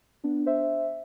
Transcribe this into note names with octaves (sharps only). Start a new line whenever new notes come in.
B3 D4
C5 E5